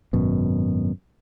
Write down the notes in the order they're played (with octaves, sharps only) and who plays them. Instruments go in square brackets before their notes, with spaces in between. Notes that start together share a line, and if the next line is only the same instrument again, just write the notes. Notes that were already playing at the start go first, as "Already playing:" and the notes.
[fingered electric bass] G#1 F#2 B2